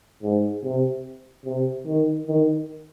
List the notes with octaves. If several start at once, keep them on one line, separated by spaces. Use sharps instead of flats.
G#2
C3
C3
D#3
D#3